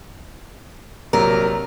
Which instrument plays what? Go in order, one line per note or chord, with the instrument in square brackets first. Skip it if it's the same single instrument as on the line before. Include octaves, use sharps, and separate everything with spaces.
[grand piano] A#1 C3 F#3 [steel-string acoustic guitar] A#4